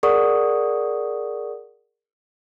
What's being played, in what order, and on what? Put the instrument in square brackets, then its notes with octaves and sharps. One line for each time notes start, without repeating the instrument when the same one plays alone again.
[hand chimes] G#4 A#4 D5 F#5 C#6 D#6